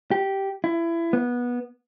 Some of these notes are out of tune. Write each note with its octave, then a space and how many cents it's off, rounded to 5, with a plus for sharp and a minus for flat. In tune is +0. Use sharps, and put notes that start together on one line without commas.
G4 -10
E4 +25
B3 -20